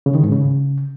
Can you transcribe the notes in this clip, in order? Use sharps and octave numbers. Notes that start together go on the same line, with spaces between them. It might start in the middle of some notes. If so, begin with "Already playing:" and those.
C#3
D#3
G#2
C#3